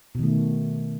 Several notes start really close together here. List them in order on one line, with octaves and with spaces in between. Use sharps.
B2 D#3 A3